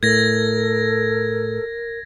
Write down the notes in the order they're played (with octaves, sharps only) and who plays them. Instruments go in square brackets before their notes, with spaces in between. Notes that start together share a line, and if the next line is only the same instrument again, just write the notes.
[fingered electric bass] A2 [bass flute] A4 [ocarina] A#4 [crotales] G#6 A#6